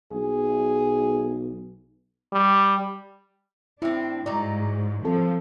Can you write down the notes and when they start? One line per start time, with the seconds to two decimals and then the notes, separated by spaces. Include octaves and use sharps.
0.13 B1 G#4
2.33 G3
3.82 A2 C4 D4 E4
4.26 G#2 F#3 D#4 D5
5.05 F3 C4 A4